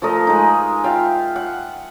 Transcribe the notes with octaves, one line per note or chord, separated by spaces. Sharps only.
F3 A3 A#4 D#5
G#3 D#4
F4 E5 F5 G5
F#5